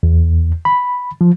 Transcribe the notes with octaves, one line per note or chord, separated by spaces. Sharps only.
E2
B5
F3